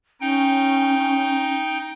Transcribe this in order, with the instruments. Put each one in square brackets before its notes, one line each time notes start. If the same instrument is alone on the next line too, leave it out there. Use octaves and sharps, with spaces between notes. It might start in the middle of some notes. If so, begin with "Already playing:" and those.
[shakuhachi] C#4 [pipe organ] D#4 G5